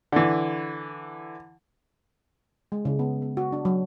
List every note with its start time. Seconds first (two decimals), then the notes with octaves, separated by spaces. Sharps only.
0.12 D3 E3
2.72 G#3
2.85 C#3
2.99 B3
3.22 B3
3.37 F#4
3.52 D4
3.65 F#3